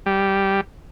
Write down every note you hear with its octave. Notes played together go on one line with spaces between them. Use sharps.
G3